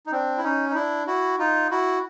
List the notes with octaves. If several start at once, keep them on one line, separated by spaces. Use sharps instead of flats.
D#4
C4 D4
E4
C#4 D#4
D#4
D4 E4
E4 F#4
D#4 F4
E4 F#4